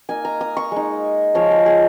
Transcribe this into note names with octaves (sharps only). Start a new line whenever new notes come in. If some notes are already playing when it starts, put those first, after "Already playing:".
A#3 D#4 G#5
A#5
D#6
C#6
G#3 D#4
F3 G#3 F4 C#5
G#4
G#4